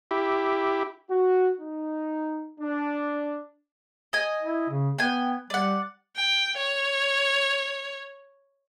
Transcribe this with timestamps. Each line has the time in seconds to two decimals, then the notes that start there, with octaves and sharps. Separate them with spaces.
0.11 E4 G4
1.09 F#4
1.60 D#4
2.60 D4
4.13 D#5 G#5
4.43 E4
4.69 C#3
4.99 B3 G5 G#5
5.50 G3 D5 F#5
6.16 G5
6.57 C#5